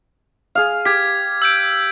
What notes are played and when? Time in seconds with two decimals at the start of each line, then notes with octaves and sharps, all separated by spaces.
0.55 G#4 F5
0.85 G4 G#6 B6
1.42 E6 G6 D7